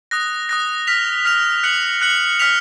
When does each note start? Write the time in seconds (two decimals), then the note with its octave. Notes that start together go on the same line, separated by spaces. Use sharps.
0.11 D#6 F#6 A#6
0.49 D#6 F#6 A#6
0.87 F6 B6 F7
1.25 F6 B6 F7
1.63 F#6 C#7 F#7
2.02 F#6 C#7 F#7
2.39 F6 B6 F7